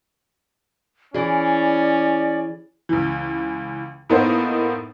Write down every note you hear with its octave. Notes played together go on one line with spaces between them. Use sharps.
E3 C#4 G#4 D5
C#2 E3
A2 A#3 B3 D#4 C5